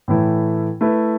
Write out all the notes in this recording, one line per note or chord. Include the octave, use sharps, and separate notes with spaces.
A2 E3 A3 E4
A3 E4 B4